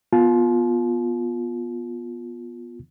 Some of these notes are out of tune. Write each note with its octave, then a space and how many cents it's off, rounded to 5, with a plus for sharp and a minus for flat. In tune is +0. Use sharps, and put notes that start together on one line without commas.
B3 -15 F4 +15 A5 -45